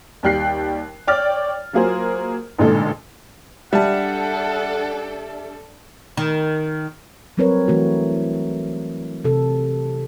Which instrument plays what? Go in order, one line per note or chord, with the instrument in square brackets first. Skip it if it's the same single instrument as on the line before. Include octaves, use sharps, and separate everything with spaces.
[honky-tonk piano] D#2 G3 G5 F#6 C7
C#5 D5 G5 D6 F6 A6
F#3 A#3 F4 G#4 A#4 C5
A1 A#2 D3 G#3 D#4 A4
[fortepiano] G3 [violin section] D4 A4 [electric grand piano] E5 A5 [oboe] F#5
[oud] D#3
[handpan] F#3 G3 C4 A#4 B4 C#5
E3 A3 F#4
C3 A4